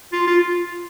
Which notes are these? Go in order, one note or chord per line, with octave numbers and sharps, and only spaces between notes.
F4
F4